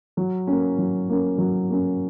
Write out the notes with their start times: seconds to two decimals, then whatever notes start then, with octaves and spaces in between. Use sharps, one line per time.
0.17 F#3
0.47 A#3 C#4
0.78 F#3
1.09 A#3 C#4
1.38 F#3
1.69 A#3 C#4